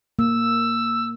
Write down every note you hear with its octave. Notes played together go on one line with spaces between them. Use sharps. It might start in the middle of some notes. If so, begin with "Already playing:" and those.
A#3 E6